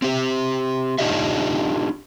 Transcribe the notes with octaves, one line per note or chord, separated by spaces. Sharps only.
C4 G4
D4 D#4 F4 G4 D#5 E5